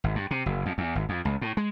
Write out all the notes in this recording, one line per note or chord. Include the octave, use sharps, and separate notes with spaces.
G#1
G2
C3
F#1
F2
E2
G#1
F2
C#2
A2
G#3